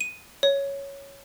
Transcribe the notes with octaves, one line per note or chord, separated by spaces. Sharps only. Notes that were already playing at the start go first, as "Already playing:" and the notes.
D#7
C#5